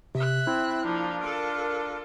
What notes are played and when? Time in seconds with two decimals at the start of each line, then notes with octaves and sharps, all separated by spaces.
0.15 C3 E5 F#6
0.47 C4 E4
0.85 F3 A#3 D4
1.21 F4 A4 A#4